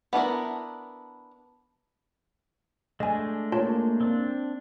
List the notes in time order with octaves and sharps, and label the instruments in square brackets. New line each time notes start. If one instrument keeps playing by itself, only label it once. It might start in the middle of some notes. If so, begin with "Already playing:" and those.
[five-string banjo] B3 D4 E4 A#4
[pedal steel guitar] G#3 A3 D4 [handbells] D#5 G#5
[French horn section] A#3 [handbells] F4 C#5 A5
[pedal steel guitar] C4 D4